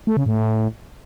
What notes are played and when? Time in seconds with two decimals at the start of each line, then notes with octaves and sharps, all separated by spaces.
0.07 A3
0.17 C#3
0.26 A2